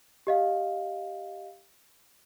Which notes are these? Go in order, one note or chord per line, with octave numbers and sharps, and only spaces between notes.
G4 D#5 F5